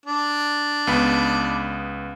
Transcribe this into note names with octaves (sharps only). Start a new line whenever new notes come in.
D4
C#2 B3 B5